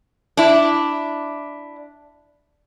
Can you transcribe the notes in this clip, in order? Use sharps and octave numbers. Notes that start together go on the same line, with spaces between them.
D4 E4